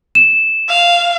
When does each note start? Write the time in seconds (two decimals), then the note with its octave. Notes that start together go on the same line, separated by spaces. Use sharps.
0.15 E7
0.69 F5